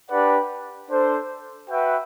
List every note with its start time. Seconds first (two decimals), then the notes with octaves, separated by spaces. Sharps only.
0.11 D4 G4 B4 D5 F#5
0.90 D4 A4 C5
1.70 F#4 B4 E5 G5